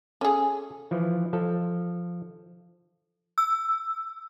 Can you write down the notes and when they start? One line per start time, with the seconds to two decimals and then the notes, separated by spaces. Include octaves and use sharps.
0.21 C#4 G#4 A4
0.91 E3 F3
1.33 F3 A4
3.38 E6